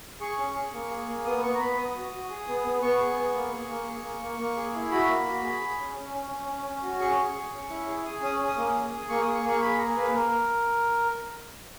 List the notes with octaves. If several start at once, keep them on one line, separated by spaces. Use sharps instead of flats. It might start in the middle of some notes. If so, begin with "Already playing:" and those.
G#4 C#6
C#4
G#4
A#3
G#4
A#3
B3 D#6
B3 C#6
A#5
B3 B5
B3 D#6
F#4
F#4
G#4
B3
B3
B3 C#6
G#4
B3
A#3
G#4
A#3
G#4
A#3
A#3
A#3
G#4
E4
F#4 B5
A#3
F#4
G#4
G#4
C#4
C#4
C#4
C#4
C#4
C#4
F#4
G#4 C#6
G#4
G#4
C#4
E4
G#4
G#4 D#6
C#4 D#6
C#4
D#6
A#3
G#4
G#4
A#3 C#6
G#4 D#6
C#6
A#3
C#6
G#4 B5
G#4 A#5
A#3 B4
A#3 A#4